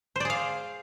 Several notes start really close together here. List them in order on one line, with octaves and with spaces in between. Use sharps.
C5 D5 G#4 F5